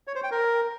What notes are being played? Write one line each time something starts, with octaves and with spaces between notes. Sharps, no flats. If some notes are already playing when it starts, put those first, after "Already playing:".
C#5
C5
G5
A#4